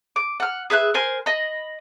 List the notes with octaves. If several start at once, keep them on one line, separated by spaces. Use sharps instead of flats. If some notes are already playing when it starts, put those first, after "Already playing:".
D6
F#5 F6
G#4 B4 E5 F#6
A#4 C5 G#5 C6
D#5 B5